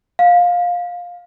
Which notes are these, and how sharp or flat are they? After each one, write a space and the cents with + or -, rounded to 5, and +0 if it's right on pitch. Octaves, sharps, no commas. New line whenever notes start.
F5 +15